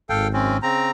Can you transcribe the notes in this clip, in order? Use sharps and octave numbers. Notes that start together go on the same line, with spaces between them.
G#1 A4 F5 G5
F#2 C4 C#4
C#3 C4 A#5